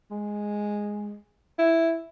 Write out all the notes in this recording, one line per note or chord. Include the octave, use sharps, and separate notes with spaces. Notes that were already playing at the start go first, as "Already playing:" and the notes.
G#3
E4